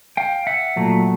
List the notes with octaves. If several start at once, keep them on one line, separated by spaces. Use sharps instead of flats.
F5 G5
E5 F#5
A#2 F#3 A3